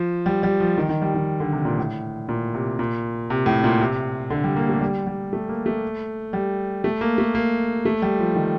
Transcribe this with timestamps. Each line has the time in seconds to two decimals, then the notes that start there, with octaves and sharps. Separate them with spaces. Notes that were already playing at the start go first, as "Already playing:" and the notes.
Already playing: F3
0.26 G3
0.43 G3
0.60 F3
0.77 D#3
0.89 D#3
1.02 G3
1.15 D#3
1.40 D3
1.53 C3
1.65 A#2
1.79 A2
2.29 A#2
2.54 C3
2.79 A#2
3.30 C3
3.46 A2
3.64 A#2
3.80 C3
4.30 D3
4.44 G3
4.56 A#3
4.69 A3
4.81 G3
5.07 G3
5.33 A3
5.49 A#3
5.66 A3
6.33 G3
6.84 A3
7.01 A#3
7.18 A3
7.35 A#3
7.85 A3
8.02 G3
8.19 F3
8.35 D#3